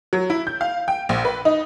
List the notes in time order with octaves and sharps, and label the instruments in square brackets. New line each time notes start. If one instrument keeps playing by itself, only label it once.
[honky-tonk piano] F#3
E4
G6
F5
G5
A#1
B4
D#4